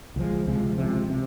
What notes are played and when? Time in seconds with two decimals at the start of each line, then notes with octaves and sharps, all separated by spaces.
0.16 C#2 C3 F3 G#3
0.47 C#2 C3 F3 G#3
0.78 C#2 C3 F3 G#3
1.10 C3 F3